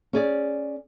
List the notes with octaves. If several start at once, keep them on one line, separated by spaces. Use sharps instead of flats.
C#4 G#4 D5